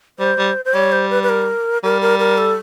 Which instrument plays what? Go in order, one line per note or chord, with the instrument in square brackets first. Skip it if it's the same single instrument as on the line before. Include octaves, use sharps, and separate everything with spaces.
[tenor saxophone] G3 [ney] C5
[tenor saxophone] G3
[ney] C5
[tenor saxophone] G3 [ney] C#5
[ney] C5
B4
B4
A#4
[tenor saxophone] G3 [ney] A#4
[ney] A#4
A#4
A4